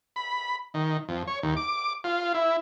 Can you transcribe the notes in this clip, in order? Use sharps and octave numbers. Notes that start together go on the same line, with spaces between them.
B5
D#3
F2
C#5
D#2
D6
F4
E4